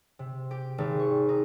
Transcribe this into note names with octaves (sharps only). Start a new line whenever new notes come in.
C3
G4
G#1
C#6
D#4